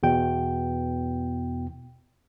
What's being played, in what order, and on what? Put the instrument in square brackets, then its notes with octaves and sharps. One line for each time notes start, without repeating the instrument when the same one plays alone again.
[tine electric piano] E2 B2 G5